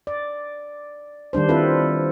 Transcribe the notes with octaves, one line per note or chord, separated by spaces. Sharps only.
D5
D#3 G3 D4 C5
C4 E4 F4 A4 B4